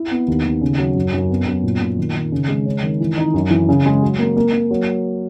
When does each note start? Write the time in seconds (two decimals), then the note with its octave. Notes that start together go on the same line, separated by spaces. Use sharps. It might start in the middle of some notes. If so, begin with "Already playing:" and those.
Already playing: E4
0.11 B3
0.28 D#2
0.45 D#2
0.61 C#3
0.78 F#3
0.95 F#2
1.13 F#2
1.30 B3
1.46 F#2
1.64 A#2
1.81 A#2
1.98 D#3
2.15 D#3
2.32 C#3
2.48 G#3
2.66 C#4
2.83 D#3
3.01 E3
3.18 D#4
3.34 F#2
3.50 E3
3.69 C#3
3.86 G#3
4.03 F#3
4.19 A#3
4.37 A#3
4.53 A#3
4.71 F#3